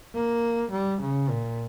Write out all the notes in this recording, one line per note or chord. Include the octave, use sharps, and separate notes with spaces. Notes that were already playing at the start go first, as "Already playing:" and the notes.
A#3
G3
C#3
A#2